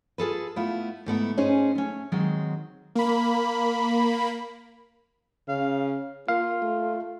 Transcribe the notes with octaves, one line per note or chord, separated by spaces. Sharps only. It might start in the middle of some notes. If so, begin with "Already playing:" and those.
F4 G#4 A4 B4
A3 B3 E4 F4
G#2 A3 B3 E4
C#4 D#4 G#4 C5
A3 C#4
D#3 F#3 G#3 C4
A#3 B5
C#3 F5
A#3 F4 F5
A3